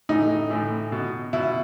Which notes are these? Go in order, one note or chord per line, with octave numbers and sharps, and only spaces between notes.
A2 E3 D#4
A2 E3
B2
B2 E4